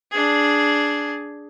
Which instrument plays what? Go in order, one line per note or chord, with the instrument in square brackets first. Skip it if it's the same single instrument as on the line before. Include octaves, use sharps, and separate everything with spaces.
[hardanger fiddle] D4 G#4